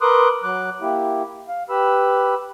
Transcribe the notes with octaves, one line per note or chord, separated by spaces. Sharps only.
A#4 B4 C6 D6 D#6 F#6
F#3 D6 F#6
A#3 E4 G4
F5
G4 B4 B5 E6